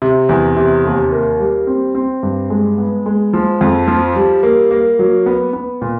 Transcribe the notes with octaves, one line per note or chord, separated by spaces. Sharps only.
C3
E2
C3
D#2
A#3
G3
C4
C4
G2
G#3
B3
G#3
F3
F2
F3
G3
A#3
A#3
F#3
B3
B3
A#2